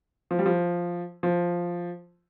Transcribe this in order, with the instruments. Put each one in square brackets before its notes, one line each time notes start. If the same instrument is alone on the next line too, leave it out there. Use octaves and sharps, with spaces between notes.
[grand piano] F3
G3
F3
F3